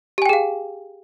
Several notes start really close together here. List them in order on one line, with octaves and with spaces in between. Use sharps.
G4 G#5 G5 G#4 F5